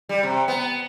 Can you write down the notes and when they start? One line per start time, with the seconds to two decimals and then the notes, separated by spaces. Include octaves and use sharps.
0.09 G3
0.23 C3
0.48 B3